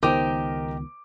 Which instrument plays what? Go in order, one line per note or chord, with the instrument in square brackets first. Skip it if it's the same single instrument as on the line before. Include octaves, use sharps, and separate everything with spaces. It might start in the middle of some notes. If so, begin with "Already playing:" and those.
[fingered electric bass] C#2 D#3 B3 [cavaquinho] D#4 G4 [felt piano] A#4 C5 D6